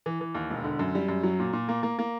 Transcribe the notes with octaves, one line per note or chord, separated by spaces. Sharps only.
E3
E3
D#2
E1
D3
F#2
G3
F#2
F#3
A#2
A#2
A#3
A#3
A#3